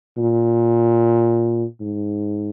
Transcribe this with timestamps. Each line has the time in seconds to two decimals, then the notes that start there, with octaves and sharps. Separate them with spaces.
0.17 A#2
1.80 G#2